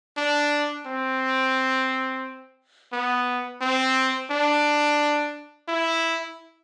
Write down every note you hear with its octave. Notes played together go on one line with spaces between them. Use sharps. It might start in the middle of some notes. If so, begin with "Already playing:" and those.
D4
C4
B3
C4
D4
E4